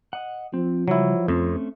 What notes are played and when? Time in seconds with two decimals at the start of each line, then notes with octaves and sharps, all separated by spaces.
0.13 D#5 F#5
0.54 F3 C4
0.88 C#3 F#3 G3 E4
1.28 F2 A3 C4 C#4